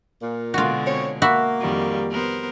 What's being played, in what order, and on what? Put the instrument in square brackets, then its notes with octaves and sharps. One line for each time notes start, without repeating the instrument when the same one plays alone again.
[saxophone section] A#2
[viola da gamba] B2 D3 G#3 [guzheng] F4 F#4
[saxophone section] C4 C#5
[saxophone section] A#3 [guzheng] F#4 E5 B5
[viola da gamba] F2 D#3 G3
B3 A#4 C5